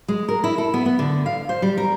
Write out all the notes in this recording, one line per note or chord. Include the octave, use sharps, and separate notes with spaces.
G#3
A#4
E4
A4
B3
B3
D3
F5
C5
G3
A#4